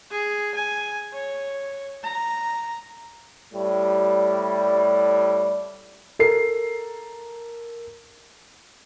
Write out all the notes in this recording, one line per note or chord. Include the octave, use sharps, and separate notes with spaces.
G#4
G#5
C#5
A#5
A2 G3
A4 A#4 C7